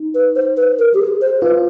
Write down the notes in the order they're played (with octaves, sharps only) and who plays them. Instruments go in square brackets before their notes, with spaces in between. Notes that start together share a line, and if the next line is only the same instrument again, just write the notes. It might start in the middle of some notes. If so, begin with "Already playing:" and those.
Already playing: [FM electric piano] D#4
[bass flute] B4
C5
B4
A#4
G4
G#4
C5
[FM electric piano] F4 [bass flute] B4